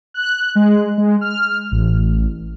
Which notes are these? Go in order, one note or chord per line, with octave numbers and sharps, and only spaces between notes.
F#6
G#3
G#3
F6
A1